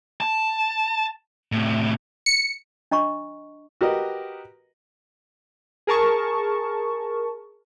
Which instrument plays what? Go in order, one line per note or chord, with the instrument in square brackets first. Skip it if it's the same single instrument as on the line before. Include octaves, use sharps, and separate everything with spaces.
[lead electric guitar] A5
A2 C3
[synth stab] C#7
[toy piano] D4 D#5 A#5 C#6
[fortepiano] F#4 G4 A#4 B4 D#5
[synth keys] G#4 A#4 A5 C#6